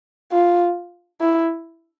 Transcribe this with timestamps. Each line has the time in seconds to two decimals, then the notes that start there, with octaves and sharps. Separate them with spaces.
0.32 F4
1.21 E4